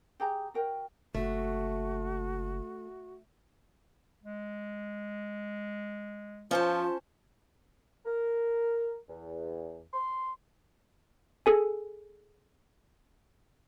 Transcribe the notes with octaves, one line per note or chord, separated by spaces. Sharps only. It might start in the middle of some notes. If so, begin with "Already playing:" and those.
G4 G#4 G5 A#5
F#4 A#4 G5
F#1 A3 F#4
G#3
F3 C#4 F4 C5 A5
A#4
E2
C6
G#4 A4 G#5